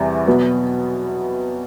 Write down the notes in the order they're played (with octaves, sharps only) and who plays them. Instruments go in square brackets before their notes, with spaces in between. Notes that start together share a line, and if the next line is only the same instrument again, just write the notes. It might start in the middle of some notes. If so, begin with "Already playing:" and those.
Already playing: [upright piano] E2 C3 E3 G3
B2 F#3 B3